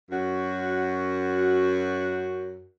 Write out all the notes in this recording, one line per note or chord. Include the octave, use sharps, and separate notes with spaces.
F#2 F#4